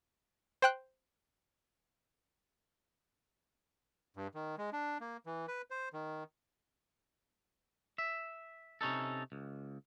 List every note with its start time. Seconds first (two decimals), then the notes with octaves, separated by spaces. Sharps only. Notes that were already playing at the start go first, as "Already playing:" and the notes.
0.62 C5 G5 F#6
4.17 G2
4.35 D#3
4.58 G#3
4.73 D4
5.00 A#3
5.26 E3
5.48 B4
5.70 C5
5.93 D#3
7.98 E5
8.81 C3 C#4 D#4 A4
9.32 C#2